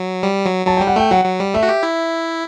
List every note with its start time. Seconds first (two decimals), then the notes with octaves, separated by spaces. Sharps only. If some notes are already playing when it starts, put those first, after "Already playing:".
Already playing: F#3
0.23 G3
0.45 F#3
0.67 F#3 A5
0.77 G3 G5
0.87 F#5
0.96 A3 G5
1.11 F#3 F#5
1.25 F#3
1.40 G3
1.54 A3 E5
1.63 F#4
1.69 G4
1.83 E4